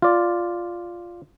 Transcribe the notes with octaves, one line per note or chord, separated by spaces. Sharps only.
F4 D5